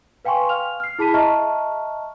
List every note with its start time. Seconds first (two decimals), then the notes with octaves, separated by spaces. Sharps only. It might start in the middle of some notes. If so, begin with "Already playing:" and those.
0.25 B4 F5 G5 G#5 C6 C#6
0.49 F5 F6 F7
0.80 F6 C7
0.99 E4 G#4 A5 B5 B6 D#7
1.14 D#5 E5 A5 A#5 C#6 F6